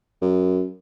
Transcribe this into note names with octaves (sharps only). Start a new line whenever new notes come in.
F#2